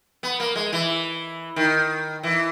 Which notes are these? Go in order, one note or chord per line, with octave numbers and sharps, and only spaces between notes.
B3
A#3
G#3
E3
D#3
E3